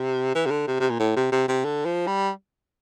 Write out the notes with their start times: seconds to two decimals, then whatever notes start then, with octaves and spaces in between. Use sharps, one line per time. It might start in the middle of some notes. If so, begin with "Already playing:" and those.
Already playing: C3
0.35 E3
0.46 C3
0.51 D3
0.68 C3
0.80 C3
0.90 A#2
0.99 A2
1.16 C3
1.32 C3
1.48 C3
1.64 D3
1.85 F3
2.07 G3